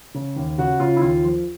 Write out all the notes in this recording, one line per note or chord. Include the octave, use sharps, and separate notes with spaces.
C#3
D#2
C#3 F#4
C#3 F4
E4
D#2 F4
F3